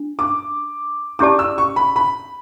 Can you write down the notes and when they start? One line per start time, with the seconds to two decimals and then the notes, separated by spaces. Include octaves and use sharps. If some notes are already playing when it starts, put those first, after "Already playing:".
Already playing: D4
0.19 D6
1.19 C#4 E4 G4 D5 A5 D6
1.39 E6
1.58 C#6
1.76 B5
1.96 B5